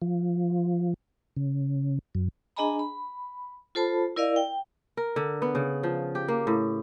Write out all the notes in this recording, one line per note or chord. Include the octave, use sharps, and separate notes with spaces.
F3
C#3
F#2
D4 G#4 D#5 G#5 A#5 B5
B5
F4 A4 C5 A5 B5
E4 A#4 D5 D#5 F5
G5
A#4
D3
B3
C#3
F3
G4
A#3
A2